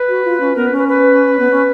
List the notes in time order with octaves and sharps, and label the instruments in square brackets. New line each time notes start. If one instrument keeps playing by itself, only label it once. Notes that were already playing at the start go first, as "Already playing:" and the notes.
Already playing: [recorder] B4
[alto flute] F#4
F4
C#4
[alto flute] B3 [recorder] A#4
[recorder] B4
[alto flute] C#4
[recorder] B4
B4
[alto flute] B3
C#4